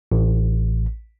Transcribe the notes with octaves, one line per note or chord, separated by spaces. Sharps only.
A1